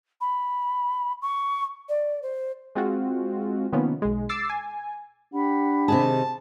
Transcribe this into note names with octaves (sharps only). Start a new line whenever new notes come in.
B5
C#6
D5
C5
G#3 C4 F4 F#4
C3 D#3 F3 A#3 B3 C#4
B1 G#3
D6 E6 A6 C7
G#5
D4 G4 F#5 B5
C3 D#3 G#4 A5